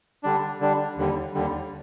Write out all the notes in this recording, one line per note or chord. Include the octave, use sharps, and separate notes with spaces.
D3 G3 D4
D3 G3 D4
D#2 D3 G3
D#2 D3 G3